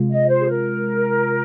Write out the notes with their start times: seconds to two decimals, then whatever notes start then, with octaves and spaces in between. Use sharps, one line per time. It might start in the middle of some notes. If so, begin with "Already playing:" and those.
Already playing: C3 G#3 F4
0.10 D#5
0.28 C5
0.40 G#4
0.47 A#4